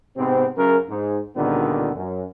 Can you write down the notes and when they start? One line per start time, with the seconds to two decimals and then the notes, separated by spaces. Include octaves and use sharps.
0.17 G#2 C3 B3 C4
0.57 F#2 C#3 A#4
0.89 G#2
1.36 C#2 A#2 D3 D#3 G3 B3
1.96 F#2